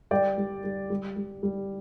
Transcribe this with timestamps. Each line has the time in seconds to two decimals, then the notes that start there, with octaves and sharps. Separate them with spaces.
0.11 G3 D5 G5
0.37 G3
0.64 G3
0.90 G3
1.16 G3
1.43 G3